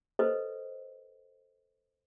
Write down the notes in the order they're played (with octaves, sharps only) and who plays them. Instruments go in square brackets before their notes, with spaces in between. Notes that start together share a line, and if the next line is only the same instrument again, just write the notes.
[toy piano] A4 B4 C5 D#5